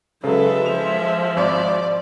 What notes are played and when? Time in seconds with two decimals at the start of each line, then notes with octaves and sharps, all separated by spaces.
0.24 C#3 F#3 G#3 A4 B4 E5
0.66 F3 F7
1.37 G#1 D5